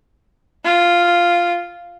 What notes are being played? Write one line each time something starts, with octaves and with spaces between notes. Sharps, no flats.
F4